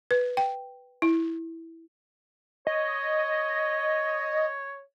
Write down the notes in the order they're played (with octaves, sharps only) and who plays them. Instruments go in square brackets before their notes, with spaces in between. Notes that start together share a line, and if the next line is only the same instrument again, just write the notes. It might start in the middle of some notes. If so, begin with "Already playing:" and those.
[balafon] B4
G5
E4
[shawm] C#5 [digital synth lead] D#5